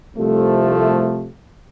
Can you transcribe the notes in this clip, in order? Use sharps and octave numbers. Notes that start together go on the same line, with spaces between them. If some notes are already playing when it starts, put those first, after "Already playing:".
C2 C3 F3 A3